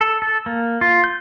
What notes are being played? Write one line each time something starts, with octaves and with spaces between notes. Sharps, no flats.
A4
A4
A#3
F4
G6